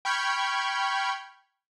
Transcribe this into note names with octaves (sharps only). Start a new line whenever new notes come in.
G5 B5 C#6 F6 G6 G#6